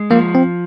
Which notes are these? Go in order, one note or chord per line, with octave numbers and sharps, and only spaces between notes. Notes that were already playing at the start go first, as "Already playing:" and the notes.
Already playing: G#3
F3 A#3
C4